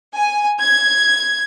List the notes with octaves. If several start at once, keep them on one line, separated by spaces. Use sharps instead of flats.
G#5
G#6